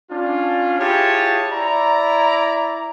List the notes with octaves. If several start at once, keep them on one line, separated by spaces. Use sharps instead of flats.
C#4 D4 F4
E4 F4 G4 G#4 C#5 A5
E4 D5 A#5